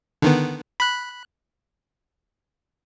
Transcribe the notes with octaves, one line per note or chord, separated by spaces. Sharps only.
D3 D#3 B3
B5 F#6